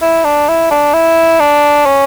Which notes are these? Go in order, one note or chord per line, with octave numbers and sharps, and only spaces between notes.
E4
D4
E4
D4
E4
D4
C#4